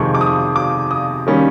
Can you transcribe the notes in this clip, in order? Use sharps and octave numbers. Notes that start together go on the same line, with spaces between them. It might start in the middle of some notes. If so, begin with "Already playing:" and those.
Already playing: F2 C3 D#3 G#3 C#6
D6
D#6
D6
D#6
D#3 G3 A#3 C#4